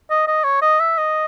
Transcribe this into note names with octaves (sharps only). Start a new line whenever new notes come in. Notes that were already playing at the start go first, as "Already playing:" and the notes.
D#5
D#5
C#5
D#5
E5
D#5